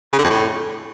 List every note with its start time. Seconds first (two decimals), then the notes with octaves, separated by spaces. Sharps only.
0.13 C#3
0.19 D3
0.24 F2
0.30 A2